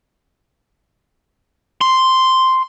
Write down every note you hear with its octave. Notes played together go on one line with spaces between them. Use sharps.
C6